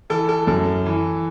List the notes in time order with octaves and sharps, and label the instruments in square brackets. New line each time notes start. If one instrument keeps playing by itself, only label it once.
[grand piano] E3 A4
A4
F#2 A4
E3